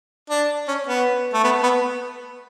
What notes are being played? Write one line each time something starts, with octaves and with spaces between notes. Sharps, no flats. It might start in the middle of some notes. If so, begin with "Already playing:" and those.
D4
C#4
B3
A3
B3
B3